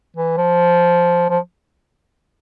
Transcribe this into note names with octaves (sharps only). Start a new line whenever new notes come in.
E3
F3
F3